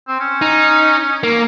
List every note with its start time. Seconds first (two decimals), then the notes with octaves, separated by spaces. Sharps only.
0.08 C4
0.20 C#4
0.42 D#4
1.23 A#3